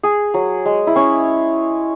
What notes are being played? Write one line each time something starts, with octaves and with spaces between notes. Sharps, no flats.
G#4
F#3
G#3
E4
C#4